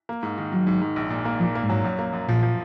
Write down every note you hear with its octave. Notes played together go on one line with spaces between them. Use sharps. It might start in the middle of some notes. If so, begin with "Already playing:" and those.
A#3
G#2
D#3
D#3 F#3
G#2
G#2
A#1
A#2
A#3
A#2 F3
A#3
G#2
F#3
F#2
A#3
F#2
A#2 F3
F3